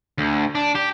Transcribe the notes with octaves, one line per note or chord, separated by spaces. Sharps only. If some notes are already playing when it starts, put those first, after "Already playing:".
D2
D4
G4